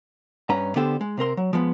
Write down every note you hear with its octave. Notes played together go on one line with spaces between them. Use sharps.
G2 C#4 B4 A#5
D3 B3 D4 G4 A4 C5
G#3
C3 C4 A#4 C6
F#3
F3 G#3 B3